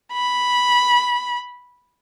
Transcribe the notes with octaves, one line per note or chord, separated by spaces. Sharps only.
B5